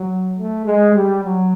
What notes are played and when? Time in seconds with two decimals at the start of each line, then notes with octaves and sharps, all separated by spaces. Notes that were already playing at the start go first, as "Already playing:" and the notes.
Already playing: F#3
0.37 A3
0.66 G#3
0.95 G3
1.24 F#3